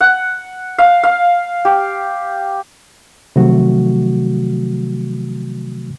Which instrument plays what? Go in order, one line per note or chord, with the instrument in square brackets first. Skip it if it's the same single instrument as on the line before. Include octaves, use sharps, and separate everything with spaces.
[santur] F#5
F5
F5
G4
[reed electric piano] C3 D#3 F3 F#3 A3 F#4